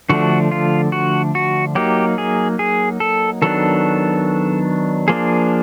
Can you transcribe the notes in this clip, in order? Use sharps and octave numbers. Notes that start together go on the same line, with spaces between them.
D3 F3 A3 D4 F#4
F4
F#4
F#4
F#3 A#3 D#4 G4
G#4
G#4
A4
D#3 F#3 B3 D4 A4
F3 A#3 D4 G#4